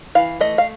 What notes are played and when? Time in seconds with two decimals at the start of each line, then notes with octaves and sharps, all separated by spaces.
0.15 E3 F5
0.41 A3 D#5
0.58 F5